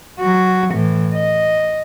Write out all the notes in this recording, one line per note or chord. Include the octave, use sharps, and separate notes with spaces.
F#3 F#4
A2 E3
D#5